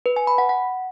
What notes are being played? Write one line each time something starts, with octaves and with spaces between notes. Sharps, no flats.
B4
G#5
B5
F#5
F#5